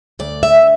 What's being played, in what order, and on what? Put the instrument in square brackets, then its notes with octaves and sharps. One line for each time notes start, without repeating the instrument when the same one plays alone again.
[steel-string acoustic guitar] D2 D5
E5